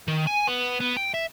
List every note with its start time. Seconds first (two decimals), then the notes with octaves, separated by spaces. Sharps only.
0.08 D#3
0.27 G#5
0.47 B3
0.80 B3
0.97 G5
1.14 E5